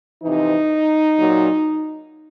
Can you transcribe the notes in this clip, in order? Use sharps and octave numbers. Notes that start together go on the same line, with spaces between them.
F2 C3 E3 D#4
A#2 F#3